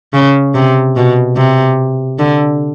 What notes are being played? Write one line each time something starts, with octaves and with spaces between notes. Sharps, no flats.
C#3
C3
B2
C3
D3